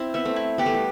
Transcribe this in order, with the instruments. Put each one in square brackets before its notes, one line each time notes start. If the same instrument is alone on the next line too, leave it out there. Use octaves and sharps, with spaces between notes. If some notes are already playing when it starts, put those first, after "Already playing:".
Already playing: [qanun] C4 [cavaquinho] E4
[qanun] B3 [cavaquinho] E5
[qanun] A3 C4
[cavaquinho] E4
[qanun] B3 [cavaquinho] G4
[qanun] A3
G3